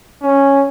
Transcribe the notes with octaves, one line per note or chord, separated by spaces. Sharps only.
C#4